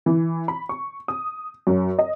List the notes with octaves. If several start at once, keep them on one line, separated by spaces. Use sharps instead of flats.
E3
B5
C#6
D#6
F#2
D#5